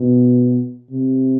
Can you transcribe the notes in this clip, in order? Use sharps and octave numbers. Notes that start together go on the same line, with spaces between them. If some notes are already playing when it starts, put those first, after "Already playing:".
Already playing: B2
C3